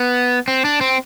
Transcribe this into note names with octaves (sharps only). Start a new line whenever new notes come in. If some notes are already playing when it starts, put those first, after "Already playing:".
Already playing: B3
C4
D4
C4